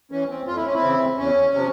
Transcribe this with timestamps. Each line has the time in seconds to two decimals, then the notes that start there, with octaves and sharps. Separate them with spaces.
0.12 E3 C#4
0.30 C4
0.47 F2 F4
0.56 E4
0.65 C#4
0.74 C4 E4
0.82 C#3 E3
1.18 E2 C#4
1.54 C3 F3